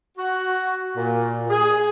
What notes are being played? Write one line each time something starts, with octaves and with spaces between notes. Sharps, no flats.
F#4
A#2
G#4